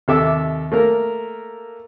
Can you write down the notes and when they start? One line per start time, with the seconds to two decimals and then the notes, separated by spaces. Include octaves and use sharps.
0.08 D#2 C3 A4 E5 D6
0.72 A3 A#3 A#4